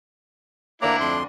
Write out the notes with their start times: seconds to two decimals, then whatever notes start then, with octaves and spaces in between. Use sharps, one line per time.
0.82 D2 A#3 D4 E4 D5 A#5
1.00 F2 C6